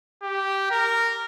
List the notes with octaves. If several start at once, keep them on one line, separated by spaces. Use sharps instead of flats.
G4
A#4